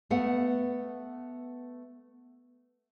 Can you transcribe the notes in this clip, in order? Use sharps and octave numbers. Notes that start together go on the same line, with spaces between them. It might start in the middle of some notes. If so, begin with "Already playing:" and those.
A3 B3 F#5